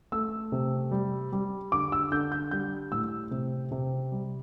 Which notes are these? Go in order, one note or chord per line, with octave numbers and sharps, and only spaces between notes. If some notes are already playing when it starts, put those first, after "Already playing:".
A3 E6
C3
G3
G3
D3 D6
E6
D3 G6
G6
G3 G6
A2 E6
C3
C3
G3